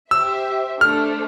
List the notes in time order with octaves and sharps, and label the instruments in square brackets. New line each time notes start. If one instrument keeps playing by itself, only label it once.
[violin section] G4 C5 E5 [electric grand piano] E6
[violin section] A3 D4 A4 C5 [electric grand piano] F6